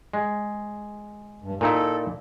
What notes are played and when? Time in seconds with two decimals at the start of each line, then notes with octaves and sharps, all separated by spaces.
0.13 G#3
1.41 G2
1.61 A#2 D#4 E4 A4